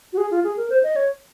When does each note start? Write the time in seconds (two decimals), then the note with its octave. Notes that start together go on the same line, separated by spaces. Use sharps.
0.13 F#4
0.18 G#4
0.31 F4
0.44 G#4
0.57 A#4
0.70 C5
0.83 D#5
0.96 C#5